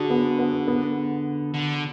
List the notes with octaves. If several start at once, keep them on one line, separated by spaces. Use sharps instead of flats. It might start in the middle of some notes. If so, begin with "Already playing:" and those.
Already playing: D3 F#4 G#4
B3
B3
B3
D3